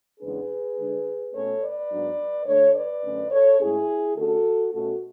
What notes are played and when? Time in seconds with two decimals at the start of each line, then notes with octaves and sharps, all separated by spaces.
0.19 E2 C#3 G#3 B3 D4 G#4 B4
0.76 D3 G#3 D4
1.33 B2 A3 C#4 A4 C#5
1.61 B4 D5
1.89 G#2 F#3 B3 D4
2.46 D3 A3 D4 A4 C#5
2.74 B4 D5
3.03 F#2 D3 A3 C#4
3.30 A4 C#5
3.59 A2 G#3 C#4 E4 G#4
4.16 D3 A3 C#4 F#4 A4
4.72 B2 A3 C#4 F#4 A4